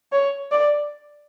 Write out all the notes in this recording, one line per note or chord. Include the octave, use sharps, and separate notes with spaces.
C#5
D5